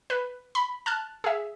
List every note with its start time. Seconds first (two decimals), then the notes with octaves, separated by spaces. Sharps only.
0.10 B4
0.55 B5
0.86 A5 F6 F#6
1.24 G#4 E5